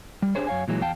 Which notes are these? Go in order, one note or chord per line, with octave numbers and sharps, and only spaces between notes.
G3
D4 G4 G#4 C5 C#5
F#2 C#5 F5 G#5
A#2 E3 F#3 G#3
E2 F5 G5 A5